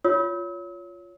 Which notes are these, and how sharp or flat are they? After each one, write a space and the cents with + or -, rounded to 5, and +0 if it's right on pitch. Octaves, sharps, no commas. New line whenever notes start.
F4 +0 C#5 +20 E6 -45